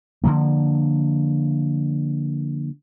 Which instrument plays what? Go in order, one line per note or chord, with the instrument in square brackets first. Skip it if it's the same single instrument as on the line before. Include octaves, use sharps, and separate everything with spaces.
[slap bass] D3 F3 A#3